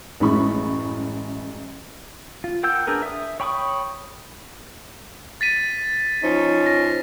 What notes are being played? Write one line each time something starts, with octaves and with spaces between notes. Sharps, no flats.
A1 F#2 G#3 E4 B5 C#6
F4
A#4 F#5 G5 E6 G6
D4 G#4 A#4 B4
E5 D#6
C#5 G5 B5 C#6 D#6
A6 B6 D#7
F3 C#4 D#4
A#6